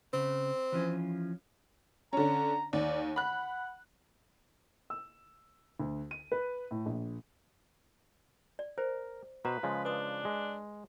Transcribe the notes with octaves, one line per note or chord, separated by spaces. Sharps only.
C#3 C4
E3 F3 C#4
D3 C#4 A#5
D#2 D5
F#5 B5 F#6
E6
D2
D#7
B4
A2
A#1
D5
A#4 C5
B2 B4 C5 A#5
C#3 F3 G#3
D4 B4 D#6
G#3